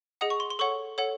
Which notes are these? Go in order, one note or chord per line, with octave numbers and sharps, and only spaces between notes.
G#4 D#5 F#5 D#6
C#6
C6
C6
A4 C#5 F#5 C#6
A4 C#5 F#5